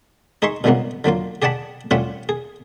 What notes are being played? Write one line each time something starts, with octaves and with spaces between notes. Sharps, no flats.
D#4 G#4 E5 C6 C#6
G2 A#2 C#3 G#3 A#3 B3
D3 F#3 A#3 F4
G4 G#4 D5 F#5 A5 B5
A2 G3 C#4 F4 E5 F#5
G#4